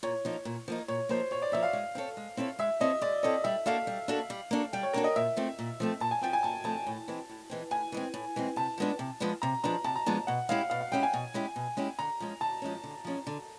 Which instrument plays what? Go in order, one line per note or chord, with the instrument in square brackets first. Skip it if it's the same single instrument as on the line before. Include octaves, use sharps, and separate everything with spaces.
[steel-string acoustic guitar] A#2 [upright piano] C#5
[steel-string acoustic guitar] F3 A#3 D#4
A#2
F3 A#3 D#4
[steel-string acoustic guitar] A#2 [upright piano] C#5
[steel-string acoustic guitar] F3 A#3 D#4 [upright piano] C5
[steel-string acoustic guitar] A#2 [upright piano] C#5
[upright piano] D5
[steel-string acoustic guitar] F3 A#3 D#4 [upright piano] E5
[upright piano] F5
[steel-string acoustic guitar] G#3
C4 E4 A4 C#5
G#3
C4 E4 A4 C#5
[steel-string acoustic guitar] G#3 [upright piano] E5
[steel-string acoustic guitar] C4 E4 A4 C#5 [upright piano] D#5
[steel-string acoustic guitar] G#3 [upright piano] D5
[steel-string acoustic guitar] C4 E4 A4 C#5 [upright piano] D#5
[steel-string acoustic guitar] G3 [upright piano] E5
[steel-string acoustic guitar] A#3 D4 F#4 A4 [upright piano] F5
[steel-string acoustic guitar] G3
A#3 D4 F#4 A4
G3
A#3 D4 F#4 A4
[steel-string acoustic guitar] G3 [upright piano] G5
[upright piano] C#5
[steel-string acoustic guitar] A#3 D4 F#4 A4 [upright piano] A#4
[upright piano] D#5
[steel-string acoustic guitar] A#2 [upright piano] E5
[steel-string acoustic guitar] F3 A3 C4
A#2
F3 A3 C4
[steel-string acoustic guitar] A#2 [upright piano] A5
[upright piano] G#5
[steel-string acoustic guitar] F3 A3 C4 [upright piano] G5
[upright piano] G#5
[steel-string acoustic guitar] A#2 [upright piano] A5
[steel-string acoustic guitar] F3 A3 C4 [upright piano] A5
[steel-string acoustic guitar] A2
E3 G#3 C4
A2
E3 G#3 C4
[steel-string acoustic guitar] A2 [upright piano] G#5
[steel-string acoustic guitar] E3 G#3 C4
A2
E3 G#3 C4
[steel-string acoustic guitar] C3 [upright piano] A5
[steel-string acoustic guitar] F3 G#3 B3 D4
C3
F3 G#3 B3 D4
[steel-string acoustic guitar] C3 [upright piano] A#5
[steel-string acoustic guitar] F3 G#3 B3 D4 [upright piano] A#5
[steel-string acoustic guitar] C3 [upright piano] A5
[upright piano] A#5
[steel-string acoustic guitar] F3 G#3 B3 D4 [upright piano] A5
[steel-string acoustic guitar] B2 [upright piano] F#5
[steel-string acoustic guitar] G#3 C#4 E4 G4 [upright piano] F5
[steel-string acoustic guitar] B2 [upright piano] F5
[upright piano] F5
[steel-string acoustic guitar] G#3 C#4 E4 G4 [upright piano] G5
[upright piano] G#5
[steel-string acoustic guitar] B2
G#3 C#4 E4 G4
B2
G#3 C#4 E4 G4
[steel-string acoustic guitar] D3 [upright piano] A#5
[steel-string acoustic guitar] F3 G#3 C#4
[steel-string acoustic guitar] D3 [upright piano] A5
[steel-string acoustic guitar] F3 G#3 C#4
D3
F3 G#3 C#4
D3